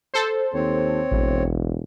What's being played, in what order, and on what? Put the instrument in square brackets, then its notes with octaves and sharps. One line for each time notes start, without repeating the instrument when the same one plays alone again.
[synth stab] A4 C5
[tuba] D#2 [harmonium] C4 C#5
[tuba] E1 [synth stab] A1